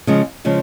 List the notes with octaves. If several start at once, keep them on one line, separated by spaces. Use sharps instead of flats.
C#3 F3 G#3
C#3 F3 G#3